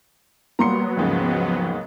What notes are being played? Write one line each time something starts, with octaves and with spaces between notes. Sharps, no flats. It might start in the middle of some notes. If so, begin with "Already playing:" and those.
F#3 G3 A#3 B3 A#5 C6 C#7
D#2 G#2 C#3 F3